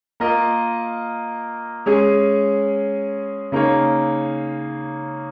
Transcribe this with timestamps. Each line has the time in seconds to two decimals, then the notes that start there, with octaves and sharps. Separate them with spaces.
0.20 A#3 F4 A#4 D#5
1.86 G#3 C#4 G#4
3.52 C#3 A#3 D#4 C#5